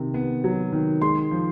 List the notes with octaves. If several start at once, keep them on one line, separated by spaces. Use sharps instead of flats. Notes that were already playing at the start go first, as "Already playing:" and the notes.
Already playing: C3 D#3
B3
F#3
D#3
G#3 C6
F3